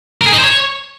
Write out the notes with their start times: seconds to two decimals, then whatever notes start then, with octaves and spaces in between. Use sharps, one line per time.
0.21 A#4
0.27 G#4
0.32 D#4
0.38 C5
0.44 C#5